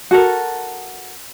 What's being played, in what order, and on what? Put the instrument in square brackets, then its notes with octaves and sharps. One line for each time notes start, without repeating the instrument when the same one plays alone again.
[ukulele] F#4 A4 A#4